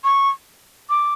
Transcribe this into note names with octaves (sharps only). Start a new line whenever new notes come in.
C#6
D6